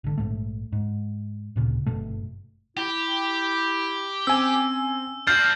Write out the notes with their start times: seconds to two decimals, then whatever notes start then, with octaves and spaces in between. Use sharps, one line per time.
0.04 G#1 D3
0.18 A#1 E2 G#2 A3
0.72 G#2
1.56 D1 A#2 C#3
1.86 G1 F#2 B2 A3
2.77 E4 G4
4.27 C4 C#4 G#5 E6
5.27 D4 F#4 F6 G6 A6 C7